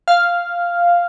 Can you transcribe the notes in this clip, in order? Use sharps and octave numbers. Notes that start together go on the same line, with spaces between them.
F5